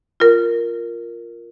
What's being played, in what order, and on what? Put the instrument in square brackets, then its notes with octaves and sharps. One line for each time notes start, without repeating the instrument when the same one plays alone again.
[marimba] F4 A#4